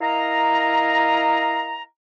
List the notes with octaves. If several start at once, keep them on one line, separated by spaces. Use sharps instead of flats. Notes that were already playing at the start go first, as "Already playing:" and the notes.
E4 A#4 D#5 F5 A#5